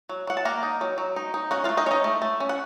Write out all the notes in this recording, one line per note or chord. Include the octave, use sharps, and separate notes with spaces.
F#3
F#3 F#5
A5
A#3 A#4 A#5
D#4
F#3
F#3
D#4
D#4
C#4 F#4 F#5
F4 F5
A3
D#4 D#5
C#4 D#4 C#5 D#5
A3
A3
C#4
F#5